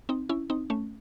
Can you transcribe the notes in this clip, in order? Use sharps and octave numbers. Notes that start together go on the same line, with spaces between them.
C4 D#4
C#4 E4
C4 D#4
A3 C#4